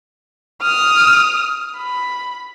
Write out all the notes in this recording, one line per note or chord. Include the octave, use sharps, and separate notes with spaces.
D#6 F6
B5